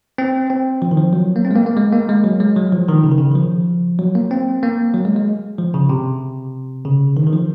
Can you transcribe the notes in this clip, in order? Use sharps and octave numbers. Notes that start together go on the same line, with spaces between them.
C4
C4
F3
D#3
F3
F#3
A#3
C4
G#3
A#3
A#3
G#3
A#3
G#3
F#3
G#3
F#3
F3
D#3
C#3
D#3
C#3
D#3
F3
F#3
A#3
C4
A#3
F#3
G#3
G#3
F3
C#3
C3
C#3
D#3
D#3
F3